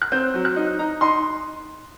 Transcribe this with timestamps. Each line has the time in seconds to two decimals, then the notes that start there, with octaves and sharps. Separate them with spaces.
0.02 F#6
0.12 C4 G6
0.34 F#3
0.45 F#6
0.56 D#4
0.79 D#4 A#5
1.01 D#4 C6